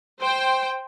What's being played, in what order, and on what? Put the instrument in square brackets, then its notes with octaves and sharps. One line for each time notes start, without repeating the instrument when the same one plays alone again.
[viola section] C5 G5